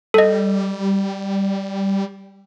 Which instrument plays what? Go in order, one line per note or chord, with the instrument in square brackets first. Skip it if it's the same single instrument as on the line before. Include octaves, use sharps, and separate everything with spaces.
[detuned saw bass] G3 [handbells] A4 D#5